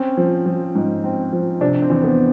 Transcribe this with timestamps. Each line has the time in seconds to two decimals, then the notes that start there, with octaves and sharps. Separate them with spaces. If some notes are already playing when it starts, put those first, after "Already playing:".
Already playing: C4 C#4
0.17 F3
0.46 F3
0.75 G#2
1.04 C4
1.33 F3
1.61 C3 D4
1.82 C4
1.90 E2
2.04 B3